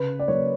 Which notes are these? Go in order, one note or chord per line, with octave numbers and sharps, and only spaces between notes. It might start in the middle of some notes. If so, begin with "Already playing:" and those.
Already playing: C#3 B4
D5
F#3 A#3 C#5